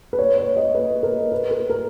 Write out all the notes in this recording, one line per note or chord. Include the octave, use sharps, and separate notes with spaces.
B4
C#5
C#5
D#5
B4
A#4
B4
A#4
A#4